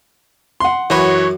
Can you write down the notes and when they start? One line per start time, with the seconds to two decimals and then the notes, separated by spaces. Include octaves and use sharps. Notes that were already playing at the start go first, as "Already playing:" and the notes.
0.60 F#5 C6
0.90 F#2 E3 F#4 C#5 G#5 B5